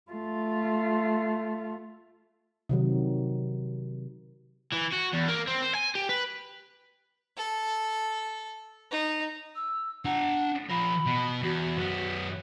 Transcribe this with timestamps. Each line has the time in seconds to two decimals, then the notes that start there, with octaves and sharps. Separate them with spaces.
0.11 A3 F4
2.69 C3 D#3 F#3
4.73 E3
4.93 F#4
5.13 E2
5.28 A#3
5.47 C4
5.62 C5
5.75 G#5
5.95 G4
6.09 B4
7.37 A4
8.91 D#4
9.56 E6
10.05 D4 F#5 A#5
10.70 F3 A#4 B5
11.06 B2
11.42 E2 F#4
11.78 F#2 B3